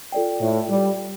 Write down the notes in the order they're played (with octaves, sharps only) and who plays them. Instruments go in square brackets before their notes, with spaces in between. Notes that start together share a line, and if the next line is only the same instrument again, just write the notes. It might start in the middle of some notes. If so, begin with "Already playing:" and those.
[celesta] F4 A4 D5 G5
[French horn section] A2
G3